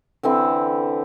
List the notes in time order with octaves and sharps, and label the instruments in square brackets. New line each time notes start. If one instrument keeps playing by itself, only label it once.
[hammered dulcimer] D3 E3 C4 B5